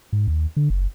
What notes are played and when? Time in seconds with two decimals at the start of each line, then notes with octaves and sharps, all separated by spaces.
0.13 G#2
0.28 D#2
0.56 D3
0.70 F#1